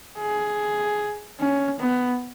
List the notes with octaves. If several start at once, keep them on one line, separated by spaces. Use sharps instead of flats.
G#4
C#4
B3